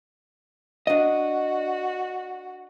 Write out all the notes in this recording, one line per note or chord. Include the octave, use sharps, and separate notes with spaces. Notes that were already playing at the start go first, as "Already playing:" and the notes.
D4 F#4 D#5